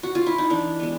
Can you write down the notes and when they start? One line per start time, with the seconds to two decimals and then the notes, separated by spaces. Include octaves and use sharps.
0.03 F#4
0.15 F4
0.26 E4
0.38 D#4
0.50 E3 D4
0.80 G#3 B3